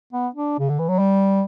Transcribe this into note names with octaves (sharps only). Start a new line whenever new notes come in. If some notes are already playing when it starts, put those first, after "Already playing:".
B3
D4
C#3
D3
E3
F#3
G3